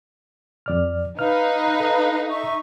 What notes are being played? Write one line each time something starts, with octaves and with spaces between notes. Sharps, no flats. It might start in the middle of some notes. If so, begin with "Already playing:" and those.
F2 D5 F6
D#4 B4 F5 F6
A4
E5 C#6